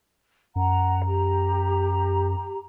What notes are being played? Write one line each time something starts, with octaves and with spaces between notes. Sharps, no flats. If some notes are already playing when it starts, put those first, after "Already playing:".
F#2 F#5 A#5
G4 A#5